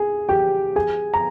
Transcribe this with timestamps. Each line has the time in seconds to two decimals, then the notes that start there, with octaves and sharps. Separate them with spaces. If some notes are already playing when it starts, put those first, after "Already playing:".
Already playing: G#4 G#5
0.29 G4 G5
0.76 G#4 G#5
1.14 A#5